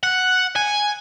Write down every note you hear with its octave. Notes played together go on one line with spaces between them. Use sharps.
F#5
G#5